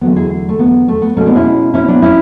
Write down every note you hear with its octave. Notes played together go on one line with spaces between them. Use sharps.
E2 D3 F#3 A3 B3
E4 G#4
A3
B3
A3
B3
B2 G#3 A3 C#4
B3 D4
C#4 E4
C#4 E4
B3 D4
C#4 E4